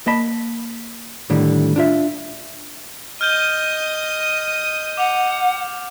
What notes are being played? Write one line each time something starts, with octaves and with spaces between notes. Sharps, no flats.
A#3 D#5 A5 B5
A2 D3 D#3 G3
D4 F4 E5
D#5 D#6 F6 G6 G7
F#5 D6 F7